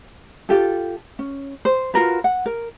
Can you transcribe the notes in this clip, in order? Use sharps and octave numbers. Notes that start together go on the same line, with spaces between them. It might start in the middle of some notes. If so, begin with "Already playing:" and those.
F4 G4 A4
C#4
C5
F4 F#4 A#4 B4
F#5
A#4